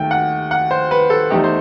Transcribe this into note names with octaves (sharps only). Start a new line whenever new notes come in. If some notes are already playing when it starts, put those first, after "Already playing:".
Already playing: D#2 D#3 A3 G5
F#5
F#5
C5
B4
A4
E2 D#3 A3 D#4 G4
C5